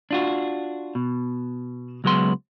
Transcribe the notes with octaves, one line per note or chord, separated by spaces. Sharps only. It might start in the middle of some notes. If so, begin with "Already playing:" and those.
D4 F4 F#4
B2
C#2 F#3 G#3 B3 C6